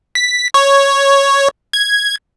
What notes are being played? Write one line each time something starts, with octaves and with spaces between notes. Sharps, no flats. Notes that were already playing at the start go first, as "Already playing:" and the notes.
B6
C#5
G#6